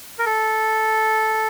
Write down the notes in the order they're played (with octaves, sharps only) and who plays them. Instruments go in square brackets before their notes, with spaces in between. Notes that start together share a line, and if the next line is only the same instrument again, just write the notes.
[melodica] A#4
A4